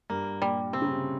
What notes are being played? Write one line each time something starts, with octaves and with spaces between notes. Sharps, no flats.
G2 A#3
A#2 G3
C3 C4
C#3
C3